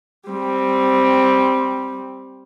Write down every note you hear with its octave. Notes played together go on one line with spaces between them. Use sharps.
G3 C4